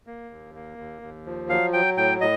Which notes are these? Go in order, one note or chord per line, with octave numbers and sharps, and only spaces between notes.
A#3
D#2
A#3
D#2
D#2
F3
F#3 F5
F#3 G5
A2 G5
A2 D#5